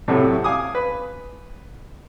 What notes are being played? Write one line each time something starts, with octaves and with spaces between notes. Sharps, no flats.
A2 C3 F#3 A3
F5 G#5 D6 D#6
B4